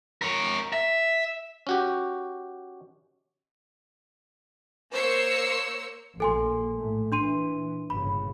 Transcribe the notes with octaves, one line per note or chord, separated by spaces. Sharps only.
A#4 C#5
E5
C#4 F#4 G4
A#3 A#4 C5 C#5 E6 C#7
A#1 A#3 A4 G#5 C6
A2 A3
A#2 E3 D4 C6 D#7
G1 A#2 C#3 B5